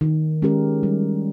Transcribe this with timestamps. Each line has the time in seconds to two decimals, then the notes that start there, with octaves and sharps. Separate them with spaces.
0.01 D#3
0.42 G#3 C#4 G4 A#4
0.83 G3